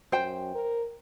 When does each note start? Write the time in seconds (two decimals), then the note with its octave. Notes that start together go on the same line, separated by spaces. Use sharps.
0.12 F#2 C5 G5
0.55 A#4